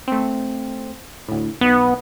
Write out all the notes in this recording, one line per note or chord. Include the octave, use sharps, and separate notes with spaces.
A3 C4
D2 A2
B1 B3 D#5